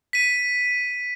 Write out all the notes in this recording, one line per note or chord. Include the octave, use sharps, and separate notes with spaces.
B6 D#7